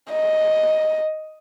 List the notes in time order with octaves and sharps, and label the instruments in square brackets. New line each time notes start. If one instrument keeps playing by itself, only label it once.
[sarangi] D#5